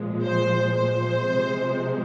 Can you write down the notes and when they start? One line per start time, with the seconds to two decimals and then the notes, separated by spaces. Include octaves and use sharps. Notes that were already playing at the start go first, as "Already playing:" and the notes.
Already playing: A#2 F3 G#3
0.24 C5
0.76 C5
1.28 C3 F3 G#3